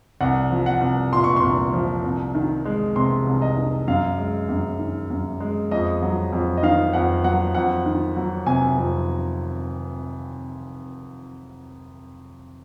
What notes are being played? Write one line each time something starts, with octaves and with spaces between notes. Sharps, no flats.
C2 F#5
F3
F#5
C2
A#2 C6
C#6
C6
C2
F3
C2
D#3
G#3
C3 C6
C2
D#5
D#3
F#2 F5
G#3
F#2
D#3
F#2
G#3
F2 D#5
F#3
F2
D#5
D#3 F5
F2 F#5
F#3 F#5
F2 F#5
D#3
F#3
C3 G#5
F2